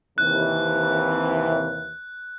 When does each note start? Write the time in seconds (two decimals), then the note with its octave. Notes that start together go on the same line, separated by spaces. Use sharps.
0.18 D#2 C3 E3 F#6